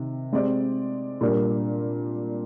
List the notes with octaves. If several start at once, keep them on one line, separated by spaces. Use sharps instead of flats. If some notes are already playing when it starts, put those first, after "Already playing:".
Already playing: C3 D#3
G#3 C4 G4 D5
A#2 G3 D4 G4 A#4